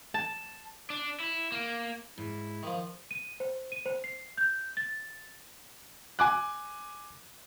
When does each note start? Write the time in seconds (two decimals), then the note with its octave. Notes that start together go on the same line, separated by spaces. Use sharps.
0.14 A5
0.90 D4
1.20 E4
1.52 A#3
2.18 G#2 E4
2.63 D#3 F3
3.11 D#7
3.40 C5
3.72 D#7
3.86 C5
4.04 C7
4.37 G6
4.77 A6
6.19 G#5 D6 F#6